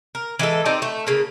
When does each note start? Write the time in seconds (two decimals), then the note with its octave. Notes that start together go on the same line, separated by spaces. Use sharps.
0.15 A#4
0.39 E3 G#3 A4
0.65 C4 D#4 G4 D5
0.82 A3
1.07 C#3 A#3